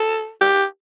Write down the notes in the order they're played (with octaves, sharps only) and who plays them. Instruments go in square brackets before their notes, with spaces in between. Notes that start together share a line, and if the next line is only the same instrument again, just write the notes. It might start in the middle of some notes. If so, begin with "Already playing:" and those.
Already playing: [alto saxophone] A4
G4